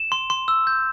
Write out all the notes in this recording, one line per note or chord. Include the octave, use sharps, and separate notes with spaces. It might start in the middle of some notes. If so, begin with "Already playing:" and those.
Already playing: E7
C6
C6
E6
G6